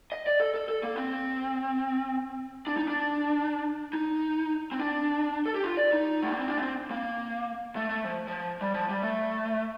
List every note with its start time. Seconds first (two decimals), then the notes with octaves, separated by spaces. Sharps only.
0.12 D#5
0.27 D5
0.40 A4
0.54 A4
0.69 A4
0.83 A#3
0.97 C4
2.67 D4
2.77 D#4
2.88 D4
3.93 D#4
4.71 C4
4.79 D4
5.46 A4
5.55 G4
5.64 F4
5.77 D5
5.93 D#4
6.23 A3
6.32 A#3
6.40 C4
6.48 D4
6.57 A#3
6.62 C4
6.91 A#3
7.76 A3
7.90 A3
8.04 F3
8.28 F3
8.61 G3
8.74 F3
8.89 G3
9.02 A3